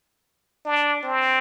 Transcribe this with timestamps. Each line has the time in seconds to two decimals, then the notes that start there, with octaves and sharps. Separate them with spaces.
0.65 D4
1.03 C4